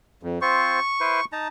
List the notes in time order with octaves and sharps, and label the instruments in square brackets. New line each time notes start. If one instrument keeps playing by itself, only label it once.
[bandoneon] F2
[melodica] C4 F4 C5 [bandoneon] C#6
[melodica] E4 B4 C5
D#4 A5 A#5